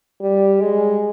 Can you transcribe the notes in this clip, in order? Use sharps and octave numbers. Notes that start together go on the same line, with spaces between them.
G3
G#3